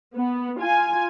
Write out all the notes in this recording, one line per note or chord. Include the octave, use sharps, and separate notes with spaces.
B3
F4 G#5